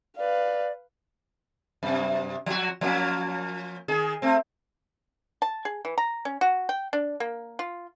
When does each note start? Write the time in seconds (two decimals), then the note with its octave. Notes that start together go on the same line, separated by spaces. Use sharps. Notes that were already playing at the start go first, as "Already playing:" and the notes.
0.18 B4 D5 F5
1.83 F#2 C3
2.46 F3 F#4
2.81 F3 A#3 C#4
3.88 D#3 G#4
4.22 A3 C4
5.42 A5
5.65 G#4
5.85 E3
5.98 A#5
6.25 C#4
6.41 F#4
6.69 G5
6.93 D4
7.20 A#3
7.59 F4